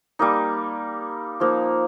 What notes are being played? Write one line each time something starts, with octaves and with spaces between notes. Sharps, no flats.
G3 A#3 D#4
F3 A#3 D#4